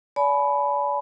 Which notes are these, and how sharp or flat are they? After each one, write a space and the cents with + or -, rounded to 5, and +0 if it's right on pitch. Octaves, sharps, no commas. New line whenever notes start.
D5 -40 G#5 +40 B5 +0